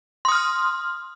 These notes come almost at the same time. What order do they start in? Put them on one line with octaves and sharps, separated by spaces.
C6 D#6 F6